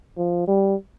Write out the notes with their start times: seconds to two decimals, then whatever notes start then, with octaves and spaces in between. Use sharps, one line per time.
0.17 F3
0.47 G3